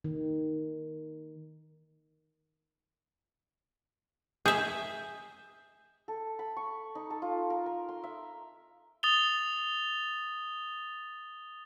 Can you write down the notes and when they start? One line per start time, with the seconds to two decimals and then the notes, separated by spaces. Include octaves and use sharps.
0.04 D#3
4.46 G#4 E5 G6
6.08 A4
6.39 B5
6.57 C#6
6.95 D#4
7.10 A4
7.22 F4
7.50 A#4
7.66 A#4
7.89 C6
8.04 E5
9.03 D#6 A6 F7 G7